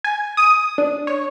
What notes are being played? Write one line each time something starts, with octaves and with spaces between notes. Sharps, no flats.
G#5
D#6
D4
C#5